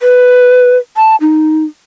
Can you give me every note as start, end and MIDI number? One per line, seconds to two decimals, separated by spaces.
0.01 0.77 71
0.97 1.16 81
1.21 1.64 63